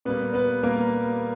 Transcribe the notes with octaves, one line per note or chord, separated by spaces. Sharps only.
A#2 G3 A#3 B3 B4
B3 B4
A#2 G3 A#3 A#4